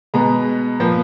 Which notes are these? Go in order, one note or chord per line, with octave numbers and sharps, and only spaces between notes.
B2 G#3 B3 A#5
A#2 F3 B3